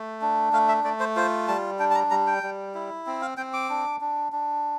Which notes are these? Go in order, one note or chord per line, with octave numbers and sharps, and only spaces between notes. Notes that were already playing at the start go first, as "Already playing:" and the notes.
Already playing: A3
D4
A3 F5
E5
A3 D5
C5
F4 C5
G3 A5
D4 G5
A5
A#5
G3 A#5
G5
G3
E4
C4
F5
C4 G5
D6
D4
D4
D4